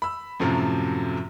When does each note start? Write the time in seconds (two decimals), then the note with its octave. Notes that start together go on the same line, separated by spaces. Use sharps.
0.02 B5 E6
0.40 F#2 A2 C3 F3 F#3